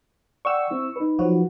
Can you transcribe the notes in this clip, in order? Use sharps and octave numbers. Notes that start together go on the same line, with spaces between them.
D5 F#5 G5 C#6 E6
C4 E4
D#4 B4
F3 F#3 F#4